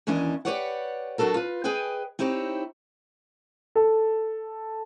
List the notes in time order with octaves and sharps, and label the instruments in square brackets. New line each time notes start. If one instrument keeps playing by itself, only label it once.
[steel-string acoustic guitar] D#2 E3 C#4 D4 D#5
G4 G#4 B4 C#5 D5 F#5
F#3 D4 F#4 A4 A#4
F4 B4
G#4 B4 D#5 G5 G#5
C4 D#4 E4 G4 C#5
[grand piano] A4